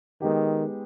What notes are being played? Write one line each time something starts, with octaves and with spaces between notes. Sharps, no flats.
D#3 G#3 B3 D#4 G4